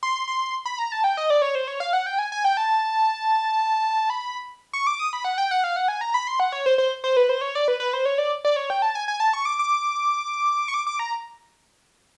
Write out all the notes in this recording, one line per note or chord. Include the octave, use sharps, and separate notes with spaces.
C6
C6
B5
A#5
A5
G5
D#5
D5
C#5
C5
C#5
F5
F#5
G5
G#5
G#5
G5
A5
B5
C#6
D6
D#6
B5
F#5
G5
F#5
F5
F#5
G#5
A#5
B5
C6
F#5
C#5
C5
C5
C5
B4
C5
C#5
D5
B4
B4
C5
C#5
D5
D5
C#5
G5
A5
G#5
G#5
A5
C#6
D6
D6
C#6
D6
D6
A#5